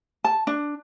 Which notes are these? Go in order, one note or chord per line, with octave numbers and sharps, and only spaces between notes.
A5
D4